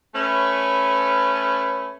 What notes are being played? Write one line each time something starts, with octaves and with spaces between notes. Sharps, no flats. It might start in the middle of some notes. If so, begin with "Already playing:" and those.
A3 C#4 B4